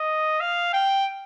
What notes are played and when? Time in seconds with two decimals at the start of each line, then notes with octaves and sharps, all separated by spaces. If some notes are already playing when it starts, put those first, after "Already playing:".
Already playing: D#5
0.40 F5
0.73 G5